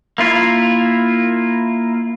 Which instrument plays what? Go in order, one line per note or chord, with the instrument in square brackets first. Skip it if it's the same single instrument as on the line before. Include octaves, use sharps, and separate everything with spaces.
[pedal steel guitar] A#3 E4 F4